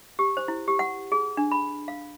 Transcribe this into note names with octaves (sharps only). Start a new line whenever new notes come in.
G4
C5
E4
G4
F#5
G#4
D4
B5
F5